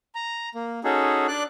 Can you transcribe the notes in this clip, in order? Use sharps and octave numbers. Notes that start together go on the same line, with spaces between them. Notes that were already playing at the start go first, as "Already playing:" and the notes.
A#5
A#3
C#4 D#4 F#4 G#4 A4
D4 D5 F#6